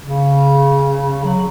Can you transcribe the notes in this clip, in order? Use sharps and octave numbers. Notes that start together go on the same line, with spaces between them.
C#3
F#3